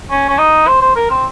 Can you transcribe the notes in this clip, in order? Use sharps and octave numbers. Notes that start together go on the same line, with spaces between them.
C#4
C#4
D#4
C5
C5
A#4
C4